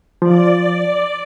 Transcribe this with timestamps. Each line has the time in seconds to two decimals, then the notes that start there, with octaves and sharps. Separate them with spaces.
0.22 F3 D5